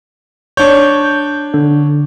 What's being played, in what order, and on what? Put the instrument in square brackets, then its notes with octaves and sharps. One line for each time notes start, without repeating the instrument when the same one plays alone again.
[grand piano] D4 C#5 [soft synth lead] G6
[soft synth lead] D3